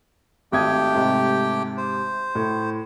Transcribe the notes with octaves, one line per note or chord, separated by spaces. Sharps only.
G#1 A3 G4 G5 D#6 G#6
G#2 C3
C5
A2